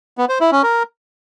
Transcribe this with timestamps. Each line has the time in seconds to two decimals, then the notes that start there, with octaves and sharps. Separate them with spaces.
0.18 B3
0.29 C5
0.40 E4
0.52 C#4
0.63 A#4